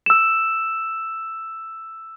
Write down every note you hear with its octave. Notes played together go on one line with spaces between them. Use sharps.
E6 E7